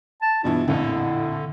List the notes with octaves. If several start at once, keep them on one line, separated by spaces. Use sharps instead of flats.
A5
G2 B2 E3 F4
A#1 F2 A2 D3 E4